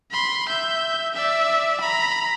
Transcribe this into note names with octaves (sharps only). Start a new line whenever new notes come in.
B5 C6
E5 G6
D5 E5
A#5 B5